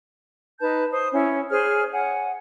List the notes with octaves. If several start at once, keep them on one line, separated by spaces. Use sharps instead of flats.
D#4 B4 A5 G6
C5 D#6
C#4 E4 C#5
G#4 C5 C#5 F6
C#5 F#5 G#5